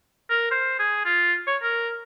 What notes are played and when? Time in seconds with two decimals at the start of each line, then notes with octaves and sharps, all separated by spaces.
0.30 A#4
0.51 C5
0.79 G#4
1.05 F4
1.47 C#5
1.63 A#4